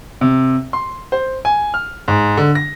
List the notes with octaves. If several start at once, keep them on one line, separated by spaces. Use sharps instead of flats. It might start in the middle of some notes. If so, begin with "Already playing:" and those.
C3
C6
C5
G#5
F6
G#2
D3
A#6